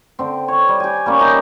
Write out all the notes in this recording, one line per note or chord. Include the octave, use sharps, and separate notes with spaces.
D3 C4
C#5
G3
G4 G#5
G3 A#3 C#4
D#4 G4